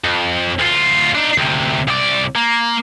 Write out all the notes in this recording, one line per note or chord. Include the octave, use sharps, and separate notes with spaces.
F2
D2 F4
D4 D#4
D2 C3
C2 D5
A#3